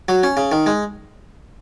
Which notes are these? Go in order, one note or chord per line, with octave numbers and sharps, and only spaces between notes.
F#3
C#4
C#3
D#3
G#3